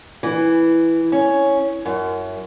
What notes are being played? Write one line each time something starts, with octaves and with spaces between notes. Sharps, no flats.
E3
C#4
F#2